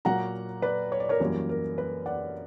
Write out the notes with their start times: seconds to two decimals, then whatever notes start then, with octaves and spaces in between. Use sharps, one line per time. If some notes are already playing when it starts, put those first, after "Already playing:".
0.05 A#2 F#3 A#3 F#5 A#5
0.62 B4 D5
0.92 C#5
1.00 D5
1.09 A#4 C#5
1.20 F#2 E3 G3 A#3 A#4
1.49 A#4
1.78 B4
2.06 D5 F#5